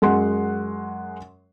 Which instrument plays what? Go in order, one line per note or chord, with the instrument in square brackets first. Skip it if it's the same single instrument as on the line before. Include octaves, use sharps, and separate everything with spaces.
[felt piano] F#2 G#3 F#5 C6